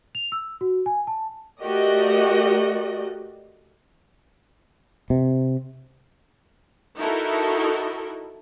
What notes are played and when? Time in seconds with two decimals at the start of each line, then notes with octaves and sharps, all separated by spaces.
0.15 F7
0.32 E6
0.61 F#4
0.86 G#5
1.07 A5
1.59 A3 F#4 G4 A#4 D5 D#5
5.10 C3
6.97 D#4 E4 F#4 A4 A#4